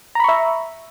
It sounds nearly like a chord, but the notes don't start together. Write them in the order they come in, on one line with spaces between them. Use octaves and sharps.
A#5 B5 C#6 E5